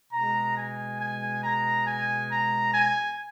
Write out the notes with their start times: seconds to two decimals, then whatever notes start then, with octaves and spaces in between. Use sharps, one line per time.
0.12 B2 G#3 A#5
0.56 G#5
1.00 G#5
1.42 A#5
1.86 G#5
2.29 A#5
2.72 G#5